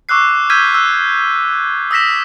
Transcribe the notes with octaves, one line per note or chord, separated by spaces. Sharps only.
C#6 D6 E6 F#6 C7
E6 F6 G6 G#6 B6 D#7
E6 F#6
D#6 E6 A#6 B6 E7